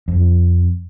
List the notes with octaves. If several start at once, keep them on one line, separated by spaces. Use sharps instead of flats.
F2